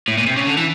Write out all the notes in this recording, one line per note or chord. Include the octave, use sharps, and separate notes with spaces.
A2
A#2
C3
C#3
D3
E3